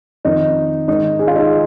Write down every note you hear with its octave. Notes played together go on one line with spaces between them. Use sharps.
F2 D#3 D#4
G#2 D#3 D#4
G#4
F4
D#4 G#4